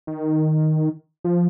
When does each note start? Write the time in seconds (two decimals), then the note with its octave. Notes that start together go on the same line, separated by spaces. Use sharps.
0.07 D#3
1.24 F3